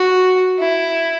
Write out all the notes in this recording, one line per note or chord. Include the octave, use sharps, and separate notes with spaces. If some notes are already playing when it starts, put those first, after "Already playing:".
Already playing: F#4
E4